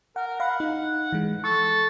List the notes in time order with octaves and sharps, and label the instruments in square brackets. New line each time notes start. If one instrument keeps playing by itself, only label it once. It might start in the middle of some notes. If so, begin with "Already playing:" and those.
[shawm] A#4 [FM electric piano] F#5
[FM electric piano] F5 B5 [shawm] F#5
[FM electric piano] D#4
E3 G#3
[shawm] A4 [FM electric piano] C#6